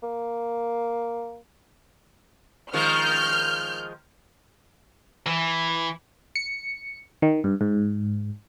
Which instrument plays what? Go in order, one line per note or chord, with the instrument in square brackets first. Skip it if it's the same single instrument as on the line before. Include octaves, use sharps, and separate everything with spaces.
[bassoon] A#3
[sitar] D#3 F3 G#3 [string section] F6 G6
[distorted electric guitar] E3
[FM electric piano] C#7
D#3
G2
G#2